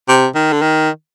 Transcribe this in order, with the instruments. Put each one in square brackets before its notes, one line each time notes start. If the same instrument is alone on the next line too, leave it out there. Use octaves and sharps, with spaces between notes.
[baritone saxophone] C3
D#3
D3
D#3